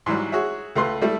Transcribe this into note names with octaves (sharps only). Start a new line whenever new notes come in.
G#2 E3 F#3 G3
F#4 G#4 C#5 E5
C#2 A3 B4 C6
G3 A3 E4